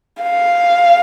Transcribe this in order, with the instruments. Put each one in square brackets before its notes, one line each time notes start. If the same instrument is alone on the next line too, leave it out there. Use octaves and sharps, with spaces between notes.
[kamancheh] F5